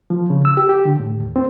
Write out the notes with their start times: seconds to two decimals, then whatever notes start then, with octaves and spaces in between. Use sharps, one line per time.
0.10 F3
0.30 C#3
0.45 E6
0.57 G4
0.69 G4
0.85 D3
0.99 A2
1.20 D#2
1.36 C4